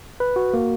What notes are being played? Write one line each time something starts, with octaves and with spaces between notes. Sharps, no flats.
B4
F#4
A#3